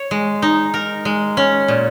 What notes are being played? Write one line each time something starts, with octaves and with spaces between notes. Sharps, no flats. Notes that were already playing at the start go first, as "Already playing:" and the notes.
Already playing: C#5
G#3
D#4
A#4
G#3
C#4
A#2